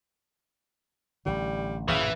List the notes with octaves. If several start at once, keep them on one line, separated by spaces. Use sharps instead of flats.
A1 D3 G3
A1 F#2 A#2 C#3 E3